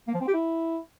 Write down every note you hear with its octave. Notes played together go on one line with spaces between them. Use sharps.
A#3
F3
C4
G4
E4